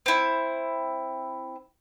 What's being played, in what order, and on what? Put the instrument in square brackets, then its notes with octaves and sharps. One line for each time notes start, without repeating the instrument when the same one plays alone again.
[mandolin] C4 E4